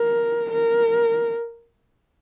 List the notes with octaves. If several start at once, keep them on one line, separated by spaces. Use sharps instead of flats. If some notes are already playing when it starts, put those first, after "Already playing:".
Already playing: A#4
A#4